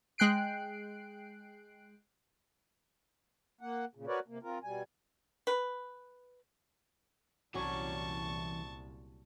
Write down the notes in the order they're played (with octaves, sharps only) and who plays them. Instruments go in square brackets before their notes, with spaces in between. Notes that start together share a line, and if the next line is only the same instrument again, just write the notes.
[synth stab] G#3 G5 F#6 C7 D7
[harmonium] A#3 F#5
A#2 C#3
F#4 A#4 B4 C#5 D5
C3 A#3
C4 F4 A#4
B2 G3 G#5
[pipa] B4
[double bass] C2 A#2 [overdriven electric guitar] E3 D5 [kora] F#3 C#4 [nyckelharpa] A5 C#6